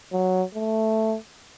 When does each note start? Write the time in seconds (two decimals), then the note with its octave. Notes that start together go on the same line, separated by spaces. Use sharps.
0.12 F#3
0.55 A3